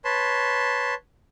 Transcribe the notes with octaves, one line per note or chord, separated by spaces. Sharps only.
B4 C#5 A5 C6